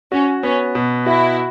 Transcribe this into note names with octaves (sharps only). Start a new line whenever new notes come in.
C#4 F#4
B3 C#4
B2
E4 F#4